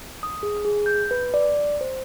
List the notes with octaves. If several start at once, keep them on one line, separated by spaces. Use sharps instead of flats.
D#6
G#4
G#4
G6
B4
D5
C5